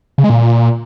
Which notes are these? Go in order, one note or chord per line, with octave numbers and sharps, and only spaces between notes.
C#3
G#3
A#2